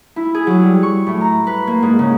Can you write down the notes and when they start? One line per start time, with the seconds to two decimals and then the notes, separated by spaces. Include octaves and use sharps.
0.16 E4
0.35 G#4
0.47 F#3
0.62 G3
0.83 C#6
1.07 A2
1.21 A#5
1.47 B4
1.67 A#3
1.83 G#2
1.99 C#3